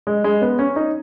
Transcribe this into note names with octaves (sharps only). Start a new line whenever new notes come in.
G#3
G#3
B3
C#4
D#4